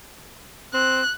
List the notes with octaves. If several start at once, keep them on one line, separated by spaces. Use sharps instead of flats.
C4 F#6